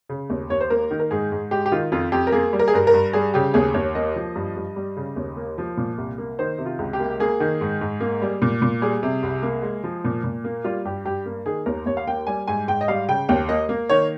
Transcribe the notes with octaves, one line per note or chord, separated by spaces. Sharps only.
C#3
D#2
D#2 C#5
C5
A#3 A#4
D#3
A#4
G#2 G#4
G#2
G#3 G4
G4
D#3 F4
F2 F4
F2 G4
A#4
A#3 G#4
G3
A#4
G#4
G2 A#4
A#4
G2
G3 G#4
C#3 G4
D#2 G#4
D#2 C#5
A#3 D#5
F3
G2
G2
G3
C#3
D#2
A#3
F3
A#2
C2
A#3
D#3 C5
C3
F4
C#2
G4
A#3
A#3 G#4
D#3
G#2
G#2
A#3
G3
A#2
A#2
G3 G#4
C3
C2
A#3
G#3
F3
A#2
A#2
A#3
G3 F4
G2 G4
G2 G4
A#3
D#3 G#4
D#2 A#4
D#2 C#5
F5
A#3 G5
G3 G#5
G#2 G#5
G#2 G5
D#5
G3 F5
C#3 G5
D#2 G5
A#3 D#5
A#3
D#3 C#5